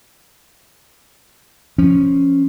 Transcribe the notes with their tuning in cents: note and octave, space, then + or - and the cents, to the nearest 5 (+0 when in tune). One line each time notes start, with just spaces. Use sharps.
F3 -10 C#4 -5